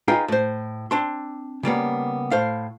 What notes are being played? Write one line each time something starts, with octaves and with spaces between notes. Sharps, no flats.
D#4 F4 G#4 B4 F5 G5
A2 C5
C4 D4 C6
C#3 G3 A#3 B3
A2 C5 F5